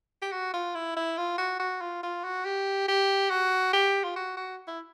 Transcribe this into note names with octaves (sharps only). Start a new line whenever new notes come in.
G4
F#4
F4
E4
E4
F4
F#4
F#4
F4
F4
F#4
G4
G4
F#4
G4
F4
F#4
F#4
E4